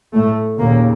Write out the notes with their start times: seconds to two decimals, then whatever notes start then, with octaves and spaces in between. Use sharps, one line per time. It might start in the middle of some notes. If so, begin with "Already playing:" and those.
0.13 A2 A3
0.58 D#2 A#2 C#3 A#3